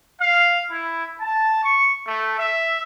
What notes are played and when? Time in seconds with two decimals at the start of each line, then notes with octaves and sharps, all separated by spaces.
0.21 F5
0.71 E4
1.21 A5
1.62 C#6
2.06 A3
2.39 E5